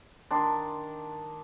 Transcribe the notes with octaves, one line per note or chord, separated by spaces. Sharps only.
D#3 D4 C6